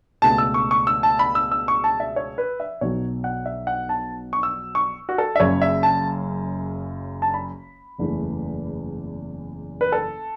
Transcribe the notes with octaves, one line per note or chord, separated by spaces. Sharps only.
C#2 B2 A3 A5
E6
C#6
C#6
E6
A5
B5
E6
E6
C#6
A5
E5
C#5
B4
E5
B1 B2 F#3 C#5
F#5
E5
F#5
A5
C#6
E6
C#6
F#4
A4
E5
F#1 F#2 C#3 C#5
E5
A5
A5
B5
F#1 E2 E3 A3
B4
A4